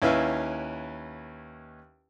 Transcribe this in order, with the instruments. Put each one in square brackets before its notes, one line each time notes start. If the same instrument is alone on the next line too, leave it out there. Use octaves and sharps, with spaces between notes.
[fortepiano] D#2 C#4 E4 B4 E5 F5